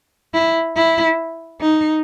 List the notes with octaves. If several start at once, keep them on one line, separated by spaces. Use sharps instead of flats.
E4
E4
D#4